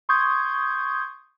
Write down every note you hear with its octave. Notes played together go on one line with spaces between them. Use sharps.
C6 C#6 D#6 G6 G#6